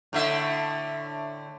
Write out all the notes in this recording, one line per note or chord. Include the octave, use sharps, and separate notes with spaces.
A2 D3 E5